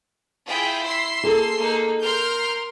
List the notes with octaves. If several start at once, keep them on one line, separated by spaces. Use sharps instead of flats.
E4 F4 G#4 E5 G5
C6 E6 C7
A#3 G#4 A4
A#3 D#4
A#4 C6 F6 G6